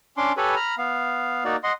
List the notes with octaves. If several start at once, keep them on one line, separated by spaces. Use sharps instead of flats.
C#4 D4 C6 D6
G4 A4 B4 C#5 G#5 B5
A#5 B5 F6
B3 F5
A#3 D#4 F#4 D5
D#5 F#5 C6